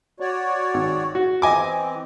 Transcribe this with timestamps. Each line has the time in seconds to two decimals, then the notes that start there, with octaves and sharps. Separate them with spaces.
0.20 F#4 C#5 D5
0.74 G#1
1.15 F#4
1.42 E3 C4 D#5 G#5 D6